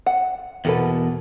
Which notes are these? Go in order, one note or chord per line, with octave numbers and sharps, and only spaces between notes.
F#5
E2 B2 A#3 A4 B4